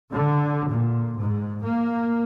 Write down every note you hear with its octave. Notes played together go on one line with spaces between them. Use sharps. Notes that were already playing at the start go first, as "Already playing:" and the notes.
D3
A#2
G#2
A#3